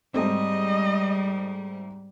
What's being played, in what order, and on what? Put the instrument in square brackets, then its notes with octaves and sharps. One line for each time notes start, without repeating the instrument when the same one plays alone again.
[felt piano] G#2 A3 C4 [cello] G3 [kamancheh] D#5